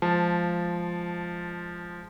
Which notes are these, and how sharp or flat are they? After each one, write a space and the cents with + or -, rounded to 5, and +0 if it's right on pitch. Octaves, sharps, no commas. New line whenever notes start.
F3 -5 G#3 +0 A5 +0